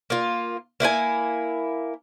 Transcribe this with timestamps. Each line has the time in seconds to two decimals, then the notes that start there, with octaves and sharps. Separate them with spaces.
0.10 A#3 F4
0.80 A#3 E4 F#4 G#5